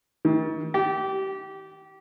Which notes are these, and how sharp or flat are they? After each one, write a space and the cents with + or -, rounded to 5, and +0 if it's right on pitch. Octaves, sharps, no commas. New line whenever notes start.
D#3 +40
G4 -25